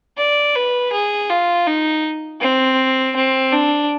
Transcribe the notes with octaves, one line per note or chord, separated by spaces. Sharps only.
D5
B4
G#4
F4
D#4
C4
C4
D4